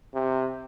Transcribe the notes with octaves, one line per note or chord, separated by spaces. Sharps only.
C3